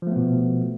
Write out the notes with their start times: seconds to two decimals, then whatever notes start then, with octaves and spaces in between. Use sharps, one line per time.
0.02 F3
0.07 A3
0.12 B3
0.16 B2